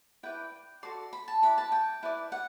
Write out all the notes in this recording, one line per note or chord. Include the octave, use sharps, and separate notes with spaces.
E4 B4 D5 G5
F#4 A4 D5 C6
B5
A5
E4 B4 D5 B5
A5
G5
E4 B4 D5
F#5